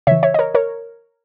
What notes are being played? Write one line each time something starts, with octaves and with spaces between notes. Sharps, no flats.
C#3 E3 C#5 E5
C#5 E5
D#5
A#4 C#5
A#4 C#5